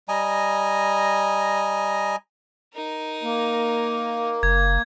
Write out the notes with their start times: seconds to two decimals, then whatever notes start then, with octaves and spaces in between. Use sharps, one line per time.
0.08 G3 D#5 G#5 A#5
2.74 D#4 A#4
3.23 A#3
4.43 F#1 G#6